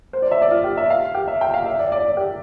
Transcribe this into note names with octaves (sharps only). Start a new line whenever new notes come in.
C5
D5
E5
D5
F4
G4
E5
F5
G4
E5
G5
F5
E5
D5
D5
D5
G4